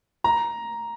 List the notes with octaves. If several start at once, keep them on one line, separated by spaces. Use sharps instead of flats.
A#5